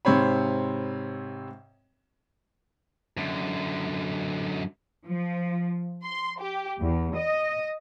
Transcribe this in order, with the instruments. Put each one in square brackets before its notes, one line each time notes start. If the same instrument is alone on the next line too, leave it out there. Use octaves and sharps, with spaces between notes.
[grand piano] G#2 C3 C4 C#5 B5
[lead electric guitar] F#2 D3
[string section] F3
C6
G4
E2
D#5